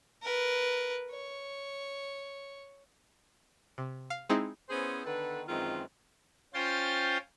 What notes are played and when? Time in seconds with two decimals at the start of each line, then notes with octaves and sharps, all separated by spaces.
0.22 A#4 B4
1.11 C#5
3.78 C3
4.10 F5
4.29 G#3 C4 D#4 E4 G#4
4.70 B3 C#4 E4 G#4 C5
5.04 D3 D#3 B3 A4 B4
5.48 F#2 D#3 E3 G#3 C4 F4
6.54 C#4 F4 C5 G5 C6 A6